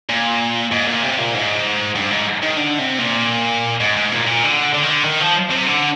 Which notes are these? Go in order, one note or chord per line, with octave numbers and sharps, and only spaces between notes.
A#2
G#2
A#2
C3
A#2
G#2
G2
G#2
D#3
D3
C3
A#2
G#2
G#2
A#2
A#2
D3
D3
D#3
D3
D#3
F3
C3
D3